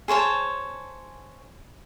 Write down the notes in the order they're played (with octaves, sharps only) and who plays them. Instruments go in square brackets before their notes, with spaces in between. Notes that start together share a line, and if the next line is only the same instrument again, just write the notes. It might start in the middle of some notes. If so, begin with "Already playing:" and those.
[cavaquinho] G#4 C5 C#5 A5